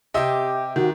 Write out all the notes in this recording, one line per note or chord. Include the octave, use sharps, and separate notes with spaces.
C3 G4 D#5 E5
D#3 F#4